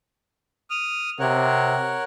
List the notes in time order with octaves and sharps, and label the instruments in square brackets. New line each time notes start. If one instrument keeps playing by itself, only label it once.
[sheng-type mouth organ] D#6 F6
[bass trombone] C3 [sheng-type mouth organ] A#4 C#5 F#5